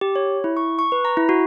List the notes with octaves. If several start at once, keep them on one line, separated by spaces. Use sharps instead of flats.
G4
C#5
E4
C#6
C#6
B4
A#5
E4
F#4